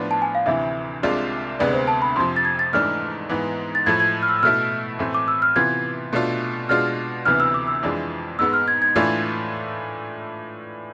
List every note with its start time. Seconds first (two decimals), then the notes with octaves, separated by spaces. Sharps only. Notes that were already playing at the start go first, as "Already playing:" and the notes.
Already playing: A2 F3 B3 D4 F4
0.11 A5
0.22 G#5
0.35 F5
0.46 D2 C3 E3 E5
1.03 C2 C3 G#3 D4 F4
1.60 D2 C3 G#3 B3 D5
1.73 C5
1.88 A5
2.02 B5
2.16 F2 C3 F3 C6
2.36 A6
2.45 G#6
2.59 A6
2.73 G#2 E3 A3 D4 F6
3.29 G#2 E3 B3
3.75 A6
3.86 A2 F3 A3 G#6
4.00 G#6
4.22 F6
4.29 E6
4.39 E6
4.43 B2 A3 E4 F6
4.99 A2 E3 A3 C4
5.14 D6
5.28 E6
5.42 F6
5.56 C3 E3 B3 F4 G#6
6.13 B2 A3 D4 F4
6.69 B2 G#3 D4 F4 F6
7.25 D2 C3 E3 B3 F6
7.40 E6
7.54 D6
7.67 E6
7.83 F2 E3 G#3 D4 F4
8.39 G#2 G#3 B3 E6
8.53 F6
8.68 G#6
8.82 G#6
8.96 A2 E3 A3 D4 F4